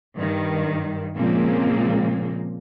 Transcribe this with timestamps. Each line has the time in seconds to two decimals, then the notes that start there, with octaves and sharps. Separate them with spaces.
0.15 G2 D#3
1.15 A#2 C#3 F3 G#3 A#3 C4